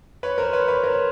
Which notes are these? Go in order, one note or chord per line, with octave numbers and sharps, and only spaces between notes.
B4 C#5
A#4 C5
B4 C#5
B4 C#5
A#4 C5